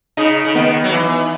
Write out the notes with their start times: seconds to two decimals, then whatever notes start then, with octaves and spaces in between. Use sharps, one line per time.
0.17 C#3 D#4
0.45 C#3
0.55 D#3 B3
0.84 F#3
0.92 E3